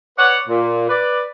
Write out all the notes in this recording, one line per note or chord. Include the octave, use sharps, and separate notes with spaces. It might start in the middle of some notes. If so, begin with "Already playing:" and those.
B4 C#5 D5 F#5
A#2
B4 D5